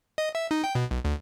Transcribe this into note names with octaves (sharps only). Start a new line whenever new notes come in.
D#5
E5
D#4
G5
B2
B1
D2